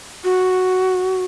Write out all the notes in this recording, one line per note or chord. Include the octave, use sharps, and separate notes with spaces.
F#4